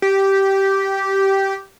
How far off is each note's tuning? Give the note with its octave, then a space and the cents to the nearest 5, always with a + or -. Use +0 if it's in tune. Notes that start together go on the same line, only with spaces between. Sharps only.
G4 -10